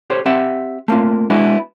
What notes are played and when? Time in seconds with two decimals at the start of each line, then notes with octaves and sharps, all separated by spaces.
0.10 G4 A4 C5 C#5
0.26 C4 G4 E5 F#5
0.88 A3 A#3 C4 F4
1.30 G#3 B3 D4 E4 F#4